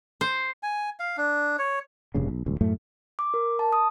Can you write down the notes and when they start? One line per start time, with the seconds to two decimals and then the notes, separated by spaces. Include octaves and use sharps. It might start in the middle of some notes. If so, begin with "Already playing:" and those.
0.21 C5
0.63 G#5
1.00 F5
1.17 D4
1.59 C#5
2.14 F1 A#1 G2 C#3
2.28 B1
2.46 D#1 C#2
2.61 F#2 A2 A3
3.19 D6
3.34 A#4
3.59 A5
3.73 D#6